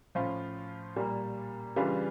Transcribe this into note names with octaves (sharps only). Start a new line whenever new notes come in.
A2 F3 C#4 F4
A#2 G3 A#3
C#3 E3 G3 D4 F4